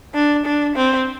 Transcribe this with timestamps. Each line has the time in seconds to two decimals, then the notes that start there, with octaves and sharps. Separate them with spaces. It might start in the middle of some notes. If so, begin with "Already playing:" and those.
0.14 D4
0.45 D4
0.75 C4